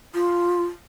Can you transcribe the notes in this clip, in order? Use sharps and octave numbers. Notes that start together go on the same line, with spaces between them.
F4